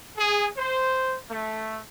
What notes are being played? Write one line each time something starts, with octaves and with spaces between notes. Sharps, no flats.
G#4
C5
A3